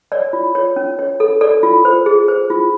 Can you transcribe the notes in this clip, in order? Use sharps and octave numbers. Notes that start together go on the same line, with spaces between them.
C#5 D5
F4
C#5
C#4
C#5
A4
A4 D5
F4
C5
G#4
C5
F4